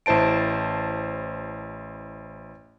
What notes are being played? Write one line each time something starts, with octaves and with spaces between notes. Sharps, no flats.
A1 E4 C5 A5 D7